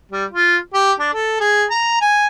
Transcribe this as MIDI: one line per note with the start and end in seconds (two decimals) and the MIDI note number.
0.12 0.25 55
0.31 0.57 65
0.74 0.92 67
0.99 1.10 62
1.13 1.39 69
1.40 1.65 68
1.70 2.00 82
2.01 2.27 80